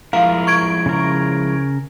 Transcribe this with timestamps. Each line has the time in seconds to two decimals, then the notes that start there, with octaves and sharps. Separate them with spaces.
0.13 F3 G#3 E4 A#4 F5
0.47 C#6 G#6 D7
0.86 C#3 A#4